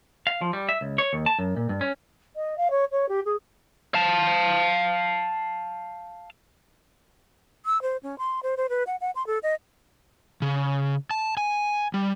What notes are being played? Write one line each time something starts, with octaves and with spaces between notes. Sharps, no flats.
F5
F3
G3
E5
C#2
C#5
D#2
A5
F#2
A#2
G2
C#4
D#5
F5
C#5
C#5
G4
G#4
F5 A5
E6
C5
C#4
C6
C5
C5
B4
F#5
F#5
C6
A4
D#5
C#3
A5
G#5
G3